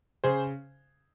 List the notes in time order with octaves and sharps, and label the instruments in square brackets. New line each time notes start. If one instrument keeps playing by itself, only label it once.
[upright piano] C#3 G#4 C5